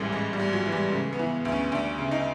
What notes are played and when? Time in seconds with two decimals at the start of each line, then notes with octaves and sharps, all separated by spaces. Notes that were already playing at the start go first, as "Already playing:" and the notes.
Already playing: A1 G#2 E3 G3 A3
0.12 A1 G#3
0.33 G3
0.40 G#2
0.53 F#3
0.66 E3
0.72 G3
0.92 C#3 A3
1.13 B3
1.19 E3
1.45 D2
1.52 C#4
1.72 D2 D4
1.98 C#3
2.11 D#4